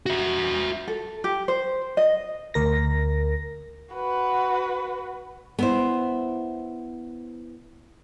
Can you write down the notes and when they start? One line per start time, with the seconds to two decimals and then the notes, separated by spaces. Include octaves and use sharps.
0.06 F#4 E5
0.88 A4
1.24 G4
1.48 C5
1.97 D#5
2.54 D2 A#4 A#6
3.94 F#4 B4
5.59 B3 E4 C5